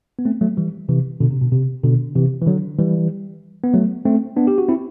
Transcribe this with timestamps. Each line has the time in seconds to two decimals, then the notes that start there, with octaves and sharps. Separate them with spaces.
0.19 B3
0.25 A3 C4
0.41 F#3 A3
0.57 E3 G3
0.89 C3 E3
1.20 B2 D3
1.31 C3
1.41 B2
1.52 C3
1.84 B2 D3
2.15 C3 E3
2.42 E3
2.46 D3 F#3
2.79 E3 G3
3.64 B3
3.74 F#3 A3
4.05 A3 C4
4.36 B3 D4
4.47 G4
4.58 F#4
4.68 C4 E4